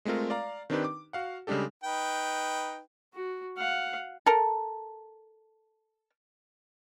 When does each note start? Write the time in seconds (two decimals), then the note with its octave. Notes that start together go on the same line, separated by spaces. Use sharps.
0.05 G#3 A3 C4 F4 A#4
0.30 D5 F5 A#5
0.70 D#3 C4 D4 D#4 G4 B4
0.84 D6
1.13 F#4 F5 F#5
1.47 C#3 G3 G#3 D4 G4 A4
1.83 D#4 B4 G5
3.13 F#4
3.57 F5 F#5
4.26 A4 A#4